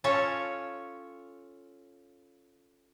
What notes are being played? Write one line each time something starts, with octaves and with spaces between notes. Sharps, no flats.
C#4 F4 A4 C#5